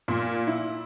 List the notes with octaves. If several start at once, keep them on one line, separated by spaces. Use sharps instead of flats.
A#2
E4